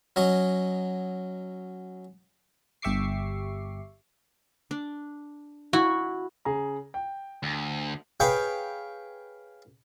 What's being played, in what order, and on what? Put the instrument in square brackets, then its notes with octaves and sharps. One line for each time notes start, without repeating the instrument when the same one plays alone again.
[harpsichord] F#3 C#4 D#5
[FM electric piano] G1 G4 E5 C#6 D6 C7
[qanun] D4
[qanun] E4 G#5 B5 [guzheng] F#4
[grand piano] C#3 G#4 A#5
G5
[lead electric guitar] D2
[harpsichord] G#4 B4 C#5 F5 G5